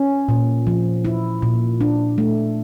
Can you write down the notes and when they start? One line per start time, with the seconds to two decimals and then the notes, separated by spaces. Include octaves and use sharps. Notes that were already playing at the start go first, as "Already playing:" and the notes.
Already playing: C#4
0.29 A#2
0.67 F3
1.05 E4
1.42 A#2
1.81 D4
2.18 A3